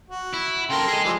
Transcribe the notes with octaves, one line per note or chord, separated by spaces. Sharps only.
F#4
E4
C#3 A4 A#4 G5 C6
G#4 D#5
E3 F3 G3